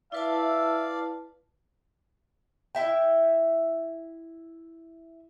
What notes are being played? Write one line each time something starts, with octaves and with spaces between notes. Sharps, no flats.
E4 B4 D5 E5 F5 A5
E4 E5 G5